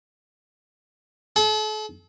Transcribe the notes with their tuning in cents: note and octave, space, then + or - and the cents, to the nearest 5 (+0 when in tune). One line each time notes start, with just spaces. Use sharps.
A4 -40